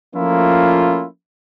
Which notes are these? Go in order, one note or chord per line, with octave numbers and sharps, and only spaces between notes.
F3 A3 A#3 C#4 E4 F4